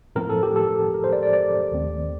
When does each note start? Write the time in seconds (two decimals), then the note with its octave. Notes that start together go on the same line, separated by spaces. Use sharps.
0.16 A2 F3 A3 C4 A#4
0.29 A4
0.43 G4
0.56 A4
0.94 A#4
1.04 C5
1.13 D5
1.23 D5
1.33 D5
1.72 D#2 D#3 A3 C4